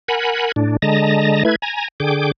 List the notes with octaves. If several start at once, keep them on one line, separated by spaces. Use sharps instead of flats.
A#4 F#5 G#5 B5
A2 D4
D3 G#3 D#5 A5 A#5
A3 E4 B4 G#6
G#5 A#5
D3 G#4 G5 D6